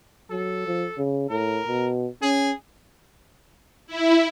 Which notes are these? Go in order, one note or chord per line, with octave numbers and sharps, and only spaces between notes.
F#3 A4
F3
C#3
A2 A#4
B2
C#4 G#4
E4